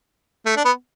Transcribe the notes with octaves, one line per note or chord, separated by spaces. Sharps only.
A3
D4
B3